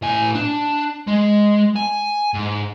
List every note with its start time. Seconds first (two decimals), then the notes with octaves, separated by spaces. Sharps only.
0.02 A2 G#5
0.35 D4
1.08 G#3
1.76 G#5
2.34 G#2